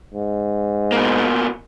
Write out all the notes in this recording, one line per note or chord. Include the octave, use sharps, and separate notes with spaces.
G#2
B2 A#3